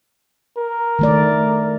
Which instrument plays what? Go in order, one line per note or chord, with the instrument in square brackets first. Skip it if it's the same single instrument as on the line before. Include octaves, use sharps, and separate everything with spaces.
[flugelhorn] A#4
[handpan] D#3 A3 D5